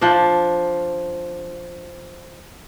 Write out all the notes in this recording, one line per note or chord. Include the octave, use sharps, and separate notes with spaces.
F3 D4